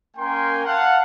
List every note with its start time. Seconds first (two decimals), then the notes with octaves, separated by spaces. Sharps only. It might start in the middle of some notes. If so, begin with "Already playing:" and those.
0.16 A#3 C#4 A#4 G5 G#5 C6
0.65 F5 F#5 A5